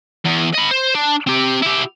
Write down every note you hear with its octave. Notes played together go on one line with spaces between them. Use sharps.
E2
D#5 B5
C5
D4
C4 G4
E4 G4